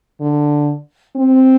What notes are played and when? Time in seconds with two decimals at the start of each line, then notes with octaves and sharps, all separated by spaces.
0.20 D3
1.17 C4